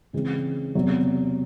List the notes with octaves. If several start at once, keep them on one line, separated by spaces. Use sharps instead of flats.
C#3 E3 G#3 C4
E2 C3 F#3